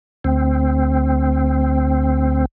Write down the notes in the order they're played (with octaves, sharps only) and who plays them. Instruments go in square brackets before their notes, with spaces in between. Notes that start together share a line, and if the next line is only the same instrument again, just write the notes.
[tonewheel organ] D2 C4